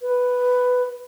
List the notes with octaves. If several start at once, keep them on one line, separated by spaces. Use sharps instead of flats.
B4